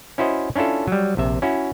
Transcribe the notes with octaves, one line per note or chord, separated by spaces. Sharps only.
C#4 E4 F#4 C5 D#5
C#4 D4 E4 F4 A4
F#3 G3
A#1 C3 E5
C#4 E4 F#4